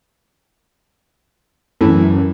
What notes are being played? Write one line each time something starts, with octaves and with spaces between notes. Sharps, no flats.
F#2 A2 E3